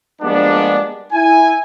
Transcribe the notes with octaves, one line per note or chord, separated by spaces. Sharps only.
F3 G3 G#3 A#3 B3 D4
E4 G#5